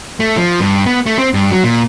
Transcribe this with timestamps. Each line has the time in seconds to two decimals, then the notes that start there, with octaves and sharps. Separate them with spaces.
0.20 A3
0.37 F3
0.60 G2
0.86 B3
1.06 A3
1.19 C4
1.34 G2
1.51 F#3
1.64 A#2